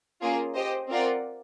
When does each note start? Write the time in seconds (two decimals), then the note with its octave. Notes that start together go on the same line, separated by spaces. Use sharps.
0.21 A#3 C#4 F4 G#4
0.55 G4 C5 D#5
0.90 C4 F4 A#4 D5 F#5